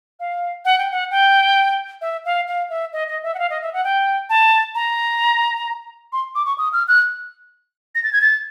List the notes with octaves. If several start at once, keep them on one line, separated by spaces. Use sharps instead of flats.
F5
F#5
G5
F#5
G5
E5
F5
F5
E5
D#5
D#5
E5
F#5
F5
D#5
E5
F#5
G5
A5
A#5
C6
D6
C#6
D#6
F6
F#6
A#6
A6
G#6
A6